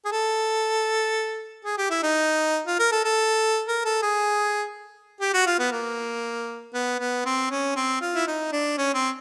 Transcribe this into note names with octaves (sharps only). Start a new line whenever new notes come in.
G#4
A4
G#4
G4
E4
D#4
F4
A#4
A4
A4
A#4
A4
G#4
G4
F#4
F4
B3
A#3
B3
B3
C4
C#4
C4
F4
E4
D#4
D4
C#4
C4